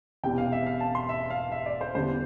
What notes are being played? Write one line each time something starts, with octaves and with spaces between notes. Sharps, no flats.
E1 E2 C3 G5
F5
E5
F5
A5
C6
E5
F5
E5
D5
C5
E2 D3 G3 C5